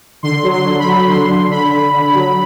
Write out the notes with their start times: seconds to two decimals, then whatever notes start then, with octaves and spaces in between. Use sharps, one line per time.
0.23 D3 C6
0.43 F#3
0.51 C6
0.65 D3
0.79 B5
0.87 F#3
1.07 D3 C6
1.29 D3
1.51 D3 B5
1.72 D3
1.93 D3
2.14 F#3